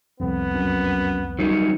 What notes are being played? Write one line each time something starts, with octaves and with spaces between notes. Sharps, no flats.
C2 F2 B3
F#2
D#3 F#3 G3 C#4